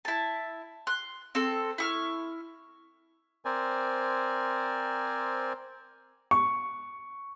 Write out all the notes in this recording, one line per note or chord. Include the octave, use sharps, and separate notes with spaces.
E4 A5
C6 F#6
C4 A4
E4 C#6 F6
C4 A#4 C5 D5 G#5
C#6